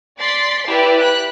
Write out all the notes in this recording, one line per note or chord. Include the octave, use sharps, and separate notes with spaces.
D5 C6 A6 B6 C7
E4 G4 B4 D5 E5
B5 F#6